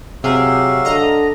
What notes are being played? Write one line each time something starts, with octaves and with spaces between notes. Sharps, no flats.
C3 F#3 G4 G#4 E5 F5
D3 D#5 A#5